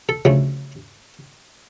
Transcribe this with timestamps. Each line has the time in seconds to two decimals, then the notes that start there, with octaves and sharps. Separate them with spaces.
0.09 A4
0.25 D2 C#3 F3 A3